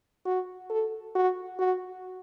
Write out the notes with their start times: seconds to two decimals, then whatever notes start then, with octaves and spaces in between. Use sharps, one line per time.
0.26 F#4
0.70 A4
1.15 F#4
1.59 F#4